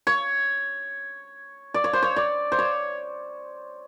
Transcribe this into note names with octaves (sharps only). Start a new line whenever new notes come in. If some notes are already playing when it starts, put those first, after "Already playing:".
C#5
D5
C#5
C5
C#5
D5
C5
C#5